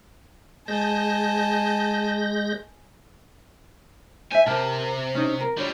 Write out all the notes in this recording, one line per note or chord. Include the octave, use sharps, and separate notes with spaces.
G#3 G#5 A5 G6 A#6
C5 E5 G#5
C3 G4 A#4 A5
C#4 D#4
A#4
F3 G3 D4 C#5